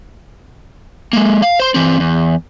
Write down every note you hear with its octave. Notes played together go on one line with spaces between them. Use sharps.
G#3 A#3
F5
C5 C6
E3 C4
E2